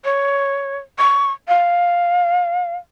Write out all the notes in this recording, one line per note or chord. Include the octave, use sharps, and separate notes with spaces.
C#5
C#6
F5